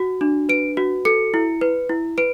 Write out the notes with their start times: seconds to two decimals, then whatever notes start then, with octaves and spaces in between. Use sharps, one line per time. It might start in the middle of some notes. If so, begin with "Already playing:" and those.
Already playing: F#4
0.21 D4
0.49 B4 D7
0.77 F#4
1.05 A4 C#7
1.34 E4
1.61 B4
1.89 E4
2.18 B4 D7